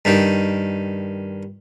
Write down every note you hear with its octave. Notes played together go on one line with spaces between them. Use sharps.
G2 D#3